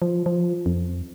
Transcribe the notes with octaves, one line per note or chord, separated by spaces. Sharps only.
F3
F3
F2